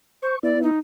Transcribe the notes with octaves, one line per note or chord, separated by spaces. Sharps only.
C5 C#6
B3 E4 D5
D#4